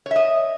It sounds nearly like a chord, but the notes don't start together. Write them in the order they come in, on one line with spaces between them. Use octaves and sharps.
C#5 E5 D#5